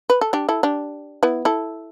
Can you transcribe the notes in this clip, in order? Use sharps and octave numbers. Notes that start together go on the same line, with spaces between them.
B4
A4
D4 G4
E4 A4
D4 G4
B3 E4
E4 A4